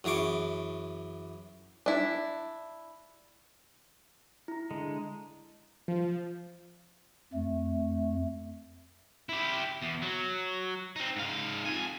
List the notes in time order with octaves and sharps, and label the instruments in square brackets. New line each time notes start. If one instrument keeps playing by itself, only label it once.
[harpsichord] F#2 E3 G#4 C#6 D6
[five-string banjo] D4 E4
[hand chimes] E4 A#5
[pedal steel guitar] D3 G#3
[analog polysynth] F3
[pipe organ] F2 A3
[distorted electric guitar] E4 G4
E2
F#3
C4 D#4
G#2 F5
F2 G#5